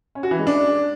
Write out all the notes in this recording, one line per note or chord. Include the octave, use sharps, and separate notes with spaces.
C#4
F#4
E3
G#3
D4